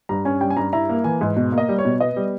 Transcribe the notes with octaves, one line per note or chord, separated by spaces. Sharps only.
G2 A#5
C#4 G#5
G3 G5
G#5
G2 A#5
E4 A#5
A#3
E3 G#5
G#2
B2
A#3
D#5
G3
C#5
B2
B3 D#5
G3